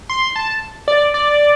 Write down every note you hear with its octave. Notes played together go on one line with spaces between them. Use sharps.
C6
A5
D5
D5